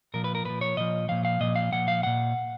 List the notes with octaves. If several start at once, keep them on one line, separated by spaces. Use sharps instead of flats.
A#2 F3 A#4
B4
A#4
A#2 F3 B4
C#5
A#2 F3 D#5
A#2 F3 F5
F5
A#2 F3 D#5
F5
A#2 F3 F#5
F5
A#2 F3 F#5